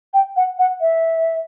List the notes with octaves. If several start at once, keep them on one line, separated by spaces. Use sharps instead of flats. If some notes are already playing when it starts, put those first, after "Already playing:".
G5
F#5
F#5
E5